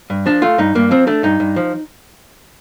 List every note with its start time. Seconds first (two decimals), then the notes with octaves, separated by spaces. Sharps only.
0.10 G2
0.26 F3 D4
0.42 A3 F4
0.58 G2 D#4
0.75 G2 A#3
0.91 F3 C4
1.07 A3 D4
1.23 G2 D#4
1.40 G2
1.56 F3